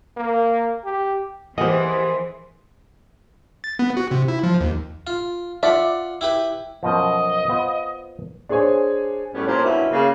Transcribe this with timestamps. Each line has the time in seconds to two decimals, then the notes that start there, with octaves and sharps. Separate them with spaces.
0.17 A#3
0.85 G4
1.58 E3 B3 G4 G#4 A#4 C5 D#5 F#5
3.64 A6
3.79 B3
3.97 F#4
4.11 C3
4.28 E4
4.43 F3
4.61 D#2
5.07 F4
5.63 F4 D5 E5 F#5
6.21 E4 G4 B4
6.83 F#2 B2 F3 D#5
7.49 B3 F4 C5
8.49 D4 G#4 C5 C#5 G#5
9.33 F#2 A2 G3 B3 C#4
9.47 F2 A#2 A#3 C4 C#4 C5
9.64 G2 B2 C#4 E4
9.91 C#3 A#3